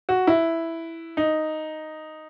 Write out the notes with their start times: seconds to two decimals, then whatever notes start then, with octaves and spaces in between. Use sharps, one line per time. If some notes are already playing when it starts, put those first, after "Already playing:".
0.09 F#4
0.27 E4
1.17 D#4